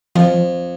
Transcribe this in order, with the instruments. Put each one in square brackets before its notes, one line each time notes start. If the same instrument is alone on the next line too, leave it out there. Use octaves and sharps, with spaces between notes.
[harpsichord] F2 [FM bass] F3